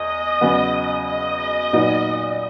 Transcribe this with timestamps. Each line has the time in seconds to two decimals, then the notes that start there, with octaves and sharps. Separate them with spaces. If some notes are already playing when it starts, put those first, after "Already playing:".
Already playing: E2 D#5
0.41 E2 C#3 F#3 B3
1.07 D#5
1.73 A#2 F#3 B3 D#4